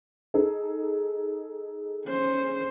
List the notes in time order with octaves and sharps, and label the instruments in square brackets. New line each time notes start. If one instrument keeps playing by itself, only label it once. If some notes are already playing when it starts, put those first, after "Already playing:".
[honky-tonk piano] D#4 G#4 A4
[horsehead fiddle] C#4 C5